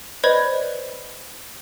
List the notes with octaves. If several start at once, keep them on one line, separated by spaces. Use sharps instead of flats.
B4 C5 D5 D#5 B5 G#6